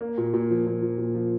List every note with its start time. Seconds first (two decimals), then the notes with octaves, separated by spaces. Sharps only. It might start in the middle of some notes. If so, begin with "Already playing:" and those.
0.01 A#3
0.18 A#2
0.34 A#2
0.50 F3
0.66 A#2
0.82 F3
0.98 A#2
1.14 F3